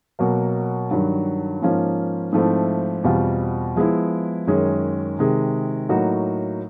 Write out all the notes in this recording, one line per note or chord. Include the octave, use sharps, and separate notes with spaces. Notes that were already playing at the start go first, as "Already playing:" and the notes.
B2 F#3 A#3
G2 D#3 F#3
G#2 F3 A#3 C#4 F4
G#2 F3 A3 C4 E4
E2 B2 G3 C4 F4
F3 G#3 B3 E4
F#2 D#3 G#3 C#4
C3 D#3 G#3
A2 F#3 A#3 D#4 F#4